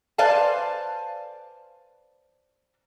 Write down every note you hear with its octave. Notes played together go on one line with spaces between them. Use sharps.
B4 C5 D5 F5 G#5 A5